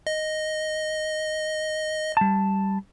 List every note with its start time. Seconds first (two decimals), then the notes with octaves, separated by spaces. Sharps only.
0.07 D#5
2.17 G3 A5